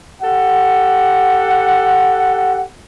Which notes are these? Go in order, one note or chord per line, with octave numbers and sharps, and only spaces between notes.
G4 A4 F#5